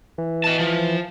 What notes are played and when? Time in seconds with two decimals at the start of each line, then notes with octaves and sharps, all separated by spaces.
0.18 E3
0.44 D#5 A5
0.59 F3